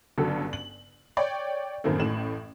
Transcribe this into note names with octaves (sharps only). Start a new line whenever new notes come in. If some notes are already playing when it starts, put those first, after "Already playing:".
G1 G2 C#3 F#3 A4
F#7
C#5 D5 G5
F#2 A2 D#3 A3 A#3 C4
A1 A2 E7 F#7